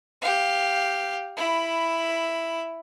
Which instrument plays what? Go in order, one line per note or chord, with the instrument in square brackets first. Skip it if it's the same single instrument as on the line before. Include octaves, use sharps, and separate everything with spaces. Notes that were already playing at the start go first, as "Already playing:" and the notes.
[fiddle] G4 F5
E4 B5